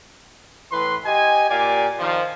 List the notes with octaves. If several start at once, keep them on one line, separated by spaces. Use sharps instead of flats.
A2 E3 B4 C6
G4 D#5 G#5
A#2 G4 D5 F5 G#5
D#3 F3